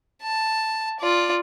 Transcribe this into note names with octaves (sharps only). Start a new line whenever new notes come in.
A5
F4 D5